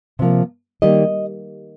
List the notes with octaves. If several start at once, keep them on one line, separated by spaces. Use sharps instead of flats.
C3 F3 A#3
D#3 G3 A#3 D#5